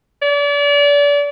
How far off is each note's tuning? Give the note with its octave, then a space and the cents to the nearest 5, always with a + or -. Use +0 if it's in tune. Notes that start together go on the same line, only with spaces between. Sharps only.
D5 -35